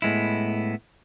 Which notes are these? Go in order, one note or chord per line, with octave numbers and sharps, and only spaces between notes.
A2 G#3 B3 E4